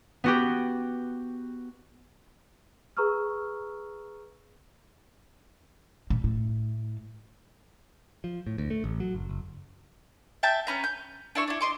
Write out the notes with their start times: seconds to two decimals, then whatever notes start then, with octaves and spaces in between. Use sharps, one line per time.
0.24 B3 F#4 G4
2.97 G#4 B4 A#5 C#6 E6 F6
6.10 A#2
6.24 A2
8.24 F3
8.47 A2
8.58 D2
8.70 A3
8.84 A1
9.00 F#3
9.14 F#1
9.29 F#1
10.43 E5 G5 A5 G6
10.67 C#4 B4 A#5
10.84 G6
11.35 D4 E4 C#6
11.48 D4 E4
11.61 D#5 C6 D6